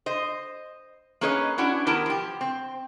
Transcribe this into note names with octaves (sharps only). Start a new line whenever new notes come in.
C5 D#5
A#3 C#4 G#4 B4 C#5 D#5
C#4 D4 E4 F#4 F#5
D#3 B3 E4 G4 A#4 A5
F3 G4
C4